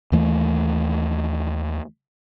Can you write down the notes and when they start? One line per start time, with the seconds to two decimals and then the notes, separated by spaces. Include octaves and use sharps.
0.12 D#2 E3 A3